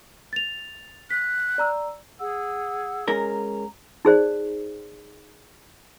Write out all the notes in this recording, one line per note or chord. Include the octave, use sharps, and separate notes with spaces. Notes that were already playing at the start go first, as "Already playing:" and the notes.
A6 F7
F#6 B6
D5 A#5 E6
G#4 F#5 E6
G#3 C#4 A#4 A#5
D#4 G#4 C5 D5